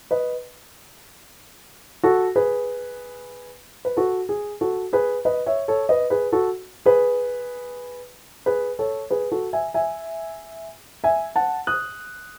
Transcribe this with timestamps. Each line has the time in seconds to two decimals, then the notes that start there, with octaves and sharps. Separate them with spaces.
0.11 B4 D#5
2.03 F#4 A4
2.36 G#4 B4
3.85 B4
3.97 F#4 A4
4.29 G#4
4.61 F#4 A4
4.93 G#4 B4
5.25 B4 D#5
5.46 C#5 E5
5.68 A4 C#5
5.89 B4 D#5
6.10 G#4 B4
6.32 F#4 A4
6.86 G#4 B4
8.46 G#4 B4
8.79 A4 C#5
9.10 G#4 B4
9.32 F#4 A4
9.53 E5 G#5
9.74 E5 G#5
11.04 E5 G#5
11.36 F#5 A5
11.67 D#6 F#6